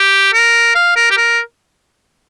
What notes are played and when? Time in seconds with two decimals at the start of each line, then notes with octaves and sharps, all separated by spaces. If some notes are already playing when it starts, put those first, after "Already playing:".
Already playing: G4
0.33 A#4
0.75 F5
0.96 A#4
1.11 G4
1.17 A#4